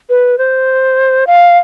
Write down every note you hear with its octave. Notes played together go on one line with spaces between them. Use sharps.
B4
C5
F5